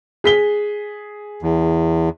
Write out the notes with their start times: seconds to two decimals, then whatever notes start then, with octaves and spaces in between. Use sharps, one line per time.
0.24 G#4 B6 G7
1.42 E2